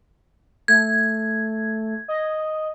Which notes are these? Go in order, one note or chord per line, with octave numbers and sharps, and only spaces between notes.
A3 G#6
D#5